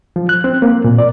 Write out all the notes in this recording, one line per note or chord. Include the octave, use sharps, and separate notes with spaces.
F3
F#6
C4
A#3
A#2
D5